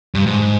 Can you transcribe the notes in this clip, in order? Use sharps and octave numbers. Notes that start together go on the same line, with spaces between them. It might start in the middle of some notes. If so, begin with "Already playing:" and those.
G2
G#2